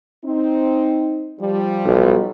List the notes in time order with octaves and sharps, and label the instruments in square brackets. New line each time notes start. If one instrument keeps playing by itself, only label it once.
[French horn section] C4 D#4
F3 G3
[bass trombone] B1